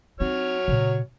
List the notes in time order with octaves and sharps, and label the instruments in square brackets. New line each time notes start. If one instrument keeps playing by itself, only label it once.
[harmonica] F#3 C#5 F6 [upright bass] C4 D#4
[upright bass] A#2 C#3